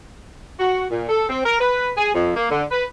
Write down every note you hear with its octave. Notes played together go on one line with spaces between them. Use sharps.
F#4
A#2
A4
C4
A#4
B4
G#4
F2
A#3
D3
B4